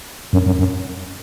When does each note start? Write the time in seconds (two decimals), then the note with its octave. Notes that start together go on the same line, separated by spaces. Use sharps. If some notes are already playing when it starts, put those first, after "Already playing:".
0.33 F#2
0.46 F#2
0.59 F#2